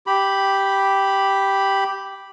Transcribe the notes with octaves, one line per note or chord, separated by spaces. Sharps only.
G4 B5